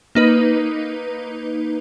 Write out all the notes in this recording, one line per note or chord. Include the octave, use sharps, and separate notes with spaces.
A#3 D#4 B4